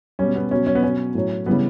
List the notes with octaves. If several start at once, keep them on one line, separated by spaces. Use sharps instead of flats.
B2 G3 C#4
B3
B2 F#3 C#4
C#4
B3
B2 F#3 C#4
A2 F#3
C#3 E3 G3 B3